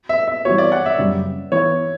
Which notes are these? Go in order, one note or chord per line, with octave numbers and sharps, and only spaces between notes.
E5
E5
E3 G3 B3 F#4 C#5
D5
F#5
E5
F#2 C#3 G3
E3 B3 E4 C#5